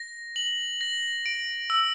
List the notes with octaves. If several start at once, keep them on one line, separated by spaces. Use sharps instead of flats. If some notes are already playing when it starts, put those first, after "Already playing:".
Already playing: A#6
F#7
A#6
D7
E6